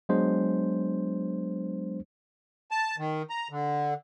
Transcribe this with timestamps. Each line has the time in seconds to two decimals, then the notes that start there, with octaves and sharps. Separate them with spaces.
0.09 F#3 G#3 B3 D4 C5
2.71 A5
2.98 D#3
3.30 A#5
3.50 D3